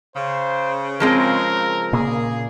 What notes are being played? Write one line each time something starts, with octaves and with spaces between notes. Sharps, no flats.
C#3 C5
F3 G#3 C4 A#4
A#2 C#3 A#3 G#4